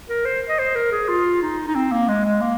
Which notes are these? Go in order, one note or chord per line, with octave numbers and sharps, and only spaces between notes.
A#4
C5
D#5
C5
A#4
G#4
F4
D#4
D#4
C4
A#3
G#3
G#3
A#3